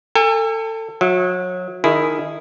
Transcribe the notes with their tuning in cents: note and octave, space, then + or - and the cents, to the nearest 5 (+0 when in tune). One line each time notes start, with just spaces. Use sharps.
A4 +25 G#5 -40
F#3 -30 E5 +0
D#3 -15 E4 +5 G#4 +0